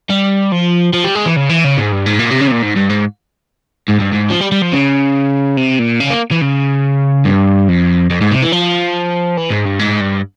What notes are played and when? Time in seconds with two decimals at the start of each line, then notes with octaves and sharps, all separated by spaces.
0.10 G3
0.52 F3
0.93 F3
1.04 G3
1.15 G#3
1.26 E3
1.36 C#3
1.49 E3
1.64 C#3
1.78 G#2
1.92 G2
2.06 G#2
2.20 A#2
2.31 C3
2.41 C#3
2.48 C3
2.52 A#2
2.63 G#2
2.76 G2
2.90 G#2
3.89 G#2
4.01 G2
4.14 G#2
4.31 F3
4.41 G3
4.52 G3
4.62 F3
4.73 C#3
5.57 C3
5.79 A#2
6.00 C#3
6.10 A#3
6.31 E3
6.41 C#3
7.25 G2
7.69 F2
8.10 F2
8.21 G#2
8.31 C3
8.42 E3
8.52 F3
9.37 E3
9.50 G#2
9.65 G2
9.79 G#2
10.00 G2